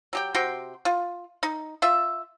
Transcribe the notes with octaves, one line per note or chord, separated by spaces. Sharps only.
F#3 G4 G5
C3 F#4 G5 C6
F4
D#4
F4 E5